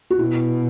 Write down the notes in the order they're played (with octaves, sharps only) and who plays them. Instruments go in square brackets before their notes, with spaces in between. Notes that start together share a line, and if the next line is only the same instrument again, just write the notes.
[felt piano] F#4
[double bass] B2 [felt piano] E4